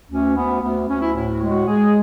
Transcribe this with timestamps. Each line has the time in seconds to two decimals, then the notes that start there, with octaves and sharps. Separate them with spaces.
0.09 D2 C#4
0.35 D2 B3
0.62 D2 B3
0.88 D2 C#4
1.01 E4
1.14 A2 E4
1.31 F#4
1.41 G#3
1.49 F#4
1.67 G#3 G#4